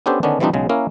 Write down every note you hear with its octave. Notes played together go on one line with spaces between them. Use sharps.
B3 C#4 D4 G4 A4 C5
D3 D#3 B3 C#4 D4
E3 F3 G3 C4 D4 D#4
B1 C#3 G#3
A#3 C#4 E4 A#4